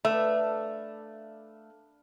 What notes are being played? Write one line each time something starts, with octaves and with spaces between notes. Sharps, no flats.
A3 D4 B4 E5 F5